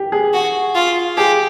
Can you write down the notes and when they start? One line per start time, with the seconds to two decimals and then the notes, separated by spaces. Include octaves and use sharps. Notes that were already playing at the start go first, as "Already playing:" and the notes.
Already playing: G4
0.12 G#4
0.33 F#4
0.75 F4
1.17 G4 G#4